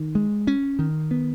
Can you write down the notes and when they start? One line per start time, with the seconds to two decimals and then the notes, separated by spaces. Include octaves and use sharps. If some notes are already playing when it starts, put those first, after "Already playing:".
Already playing: D#3
0.15 G#3
0.47 C#4
0.79 D#3
1.11 B3